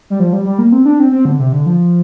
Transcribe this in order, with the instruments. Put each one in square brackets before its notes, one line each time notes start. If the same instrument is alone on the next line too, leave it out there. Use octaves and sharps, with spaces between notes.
[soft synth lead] G3
F3
G3
G3
A#3
C4
D4
C4
C4
D3
C3
D3
F3